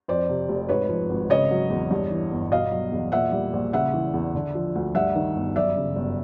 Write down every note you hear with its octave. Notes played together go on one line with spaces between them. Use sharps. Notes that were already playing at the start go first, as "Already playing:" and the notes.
F2 C5 D5
C3
F1
G#2 B4 C#5
F3
G#1
C#3 C#5 D#5
F#3
E2
G2
E3
G1
B2 D#5 F5
F#3
E2
A#2 E5 F#5
G3
A#1
C#3 E5 F#5
E3
E2
D3
F3
D2
G2 E5 F#5
D#3
G1
F#2 D5 E5
C#3
G1